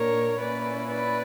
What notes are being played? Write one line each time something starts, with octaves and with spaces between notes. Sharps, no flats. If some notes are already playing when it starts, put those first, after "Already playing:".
Already playing: A#2 A#3 D4 A#4 C#5
A#2 A#3 C#4 E4 B4 D5
B4 D5